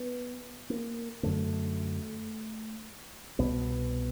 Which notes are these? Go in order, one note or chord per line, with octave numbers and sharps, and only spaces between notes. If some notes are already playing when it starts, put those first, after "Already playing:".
Already playing: B3
A#3
F#2 D3 A3
C2 B2 B3